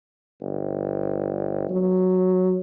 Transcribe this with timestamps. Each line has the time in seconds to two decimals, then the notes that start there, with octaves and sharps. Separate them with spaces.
0.41 G1
1.70 F#3